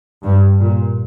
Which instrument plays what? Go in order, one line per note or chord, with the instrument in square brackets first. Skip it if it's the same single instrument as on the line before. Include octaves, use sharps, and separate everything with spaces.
[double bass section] G2
A#2